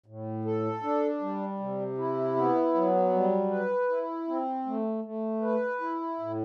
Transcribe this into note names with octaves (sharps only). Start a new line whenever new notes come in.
A2
A4
D4
G3
C3
E4
B3
F#3
G3
B4
E4
C4
A3
A3
B4
E4
A2